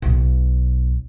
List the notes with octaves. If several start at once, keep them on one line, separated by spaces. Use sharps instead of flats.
B1